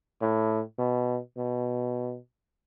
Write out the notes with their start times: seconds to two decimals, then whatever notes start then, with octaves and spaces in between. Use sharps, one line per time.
0.21 A2
0.78 B2
1.37 B2